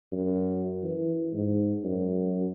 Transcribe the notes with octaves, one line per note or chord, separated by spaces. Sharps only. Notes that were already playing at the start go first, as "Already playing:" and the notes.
F#2
E3
G#2
F#2